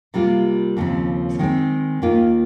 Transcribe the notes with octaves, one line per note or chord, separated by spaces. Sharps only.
C3 G3 A#3 F4
D#2 C#3 F3 C4
D#3 G#3 C4
D#2 D#3 A#3 F4